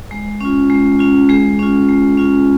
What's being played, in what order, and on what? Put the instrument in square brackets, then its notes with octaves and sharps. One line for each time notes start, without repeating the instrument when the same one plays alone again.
[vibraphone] G#3
C#4 F4
G#3
C#4 F4
G#3 G#4
C#4 F4
G#3
C#4 F4